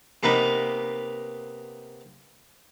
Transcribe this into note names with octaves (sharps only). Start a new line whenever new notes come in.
C3 A#3 B3 D#4